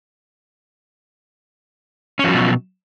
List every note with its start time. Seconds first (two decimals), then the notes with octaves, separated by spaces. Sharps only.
2.19 C#4
2.24 F3
2.29 F#3
2.34 B2